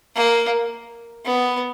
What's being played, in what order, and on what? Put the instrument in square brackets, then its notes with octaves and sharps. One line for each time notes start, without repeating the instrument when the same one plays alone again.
[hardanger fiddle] A#3
B3